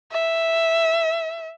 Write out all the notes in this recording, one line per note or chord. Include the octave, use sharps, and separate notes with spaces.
E5